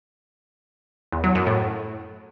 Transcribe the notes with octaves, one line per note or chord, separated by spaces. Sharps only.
E2
F#3
F#2
A2